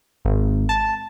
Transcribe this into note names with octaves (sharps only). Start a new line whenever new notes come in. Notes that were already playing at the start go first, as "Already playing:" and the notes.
G#1
A5